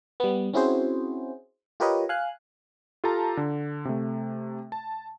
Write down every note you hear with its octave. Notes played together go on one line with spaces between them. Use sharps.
G3 B3
C4 C#4 E4 F#4 G#4 C5
F4 G4 A#4 B4 C#5 D#5
F5 G#5 F#6
F4 G4 A4 F5 A5 A#5
D3
C3 A3
A5